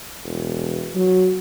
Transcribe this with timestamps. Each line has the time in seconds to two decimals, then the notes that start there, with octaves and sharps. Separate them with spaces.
0.24 E1
0.95 F#3